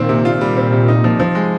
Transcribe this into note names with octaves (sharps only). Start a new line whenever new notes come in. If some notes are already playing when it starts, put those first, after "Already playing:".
Already playing: A#2 D#3 C4
C3
F4
G3
C4
C3
D#4
F3
F3
G#3